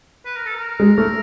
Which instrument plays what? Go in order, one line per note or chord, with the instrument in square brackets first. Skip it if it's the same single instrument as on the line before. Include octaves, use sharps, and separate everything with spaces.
[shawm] B4
A#4
A4
A#4
[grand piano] G#3
[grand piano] A3 [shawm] A#4